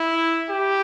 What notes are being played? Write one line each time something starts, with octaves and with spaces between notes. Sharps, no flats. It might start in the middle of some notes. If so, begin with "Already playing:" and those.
Already playing: E4
G4